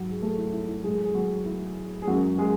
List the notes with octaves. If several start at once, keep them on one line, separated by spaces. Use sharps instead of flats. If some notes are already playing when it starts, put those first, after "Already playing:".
Already playing: G#2 F#3 F#4
G#4
A3 A4
E4
E4
E4
A2 F#3 G#3 G#4
G#4
F#3 F#4
E4
G#4
F#2 E3 F#3 G#3 F#4
G#3 G#4